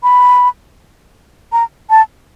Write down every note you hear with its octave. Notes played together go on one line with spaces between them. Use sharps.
B5
A#5
A5